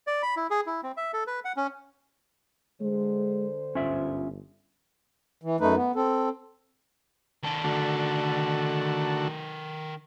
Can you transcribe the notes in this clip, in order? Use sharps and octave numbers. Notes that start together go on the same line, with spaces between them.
D5
B5
E4
G#4
E4
C4
E5
A4
B4
F#5
C#4
D3 G#3 C5
G1 C#4 F4 E5
E3
F#2 A3 D#4 B4
B3
C4 A4
D#3 A4
D3 A3 F#4